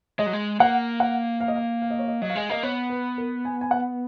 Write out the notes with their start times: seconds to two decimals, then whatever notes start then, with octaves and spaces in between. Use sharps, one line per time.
0.19 G#3 D#5
0.26 F#3
0.33 G#3
0.60 A#3 F#5
1.00 F#5
1.40 F5
1.48 D#5
1.56 F5
1.82 F5
1.90 D#5
1.99 C#5
2.08 D#5
2.22 F#3 D#5
2.30 F5
2.35 G#3 D#5
2.49 A#3 D#5
2.63 B3 C#5
2.90 B4
3.18 A#4
3.45 G#5
3.61 G#5
3.71 F#5